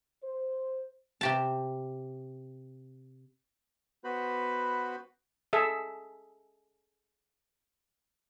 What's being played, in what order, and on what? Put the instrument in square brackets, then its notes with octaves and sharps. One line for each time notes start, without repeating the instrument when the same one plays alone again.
[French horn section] C5
[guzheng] C3 G4 A5
[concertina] B3 F#4 B4 C5 B5
[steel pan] G#4 A4 E5